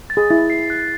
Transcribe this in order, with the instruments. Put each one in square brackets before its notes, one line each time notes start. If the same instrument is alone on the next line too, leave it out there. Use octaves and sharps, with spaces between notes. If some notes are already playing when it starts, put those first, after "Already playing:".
[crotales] A6
[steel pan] G#4
[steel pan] E4 [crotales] A6
[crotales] C7
F#6